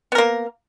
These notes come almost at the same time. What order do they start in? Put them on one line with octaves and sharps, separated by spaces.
B3 A#4 A#3